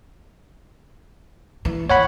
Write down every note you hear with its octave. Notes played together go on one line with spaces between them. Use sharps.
E3
G2 D#3 C#5 F#5 B5